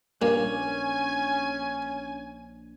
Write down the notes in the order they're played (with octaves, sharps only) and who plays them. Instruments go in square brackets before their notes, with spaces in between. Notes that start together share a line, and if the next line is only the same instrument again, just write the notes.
[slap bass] A#1 D4 [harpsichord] G2 A#2 A#3 [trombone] C#4 [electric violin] G#5